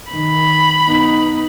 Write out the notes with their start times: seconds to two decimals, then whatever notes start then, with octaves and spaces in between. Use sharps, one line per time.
0.11 D#3 B5
0.87 B3 D#4